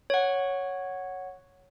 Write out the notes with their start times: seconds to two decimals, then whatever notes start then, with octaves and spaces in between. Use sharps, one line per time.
0.10 C#5 F#5